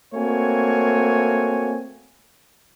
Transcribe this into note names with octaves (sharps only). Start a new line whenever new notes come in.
A3 A#3 C4 F#4 C#5 G#5